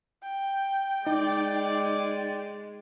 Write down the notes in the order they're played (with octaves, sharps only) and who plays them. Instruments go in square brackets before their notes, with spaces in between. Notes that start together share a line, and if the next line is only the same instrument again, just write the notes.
[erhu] G5
[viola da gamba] G#3 [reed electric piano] D#4 [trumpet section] D5